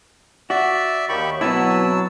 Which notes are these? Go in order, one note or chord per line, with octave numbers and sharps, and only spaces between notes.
F#4 D5 E5
D#2 G4 B5 C#6
B2 F#3 B3 C4 E4 A5 E6